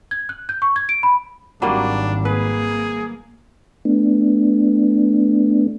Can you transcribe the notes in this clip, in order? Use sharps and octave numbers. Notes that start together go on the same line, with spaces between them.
G#6
F#6
G6
C#6
G#6
D7
B5
G#1 F#3 G3 A#3 D4
A#3 G#4 B4
A3 B3 D4